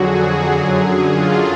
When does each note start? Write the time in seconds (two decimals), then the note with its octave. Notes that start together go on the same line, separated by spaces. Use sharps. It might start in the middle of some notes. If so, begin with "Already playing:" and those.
Already playing: F2 D3 F#3 F#4 G#4
0.23 G#4
0.52 F#2 D3 F#3
1.10 F4